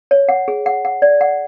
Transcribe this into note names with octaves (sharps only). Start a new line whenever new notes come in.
C#5
F#5
G#4
F#5
F#5
D5
F#5